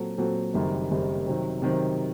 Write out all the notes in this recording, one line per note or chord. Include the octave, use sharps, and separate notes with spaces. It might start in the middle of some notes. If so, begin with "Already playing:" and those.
Already playing: A#2 F#3 C4 F#4 A4
A#2 F#3 C4 F#4 A4
F#1 F#2 D#3 G3 C4
F#1 F#2 D#3 G3 C4
C3 D#3 F#3 C4
C3 D#3 F#3 C4